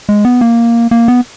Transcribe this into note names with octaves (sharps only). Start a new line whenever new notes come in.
G#3
B3
A#3
A#3
B3